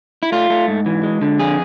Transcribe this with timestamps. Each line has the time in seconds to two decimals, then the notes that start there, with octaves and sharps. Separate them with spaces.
0.23 E4
0.32 A3 F4
0.50 A3
0.68 G#2
0.86 E3
1.03 G#3
1.21 D3
1.39 F2 G#4